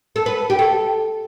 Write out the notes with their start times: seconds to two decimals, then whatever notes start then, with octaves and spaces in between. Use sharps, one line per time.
0.16 A4
0.26 B4
0.50 G4
0.59 A4